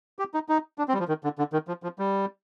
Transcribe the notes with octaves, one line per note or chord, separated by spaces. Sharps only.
G4
D#4
D#4
D4
C4
G3
F3
D#3
D3
D3
D#3
F3
F3
G3